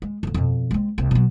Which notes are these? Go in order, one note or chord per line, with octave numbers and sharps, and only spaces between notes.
G#3
F2 D3
F2 B2
G#3 C4
C2 C4
B2 F#3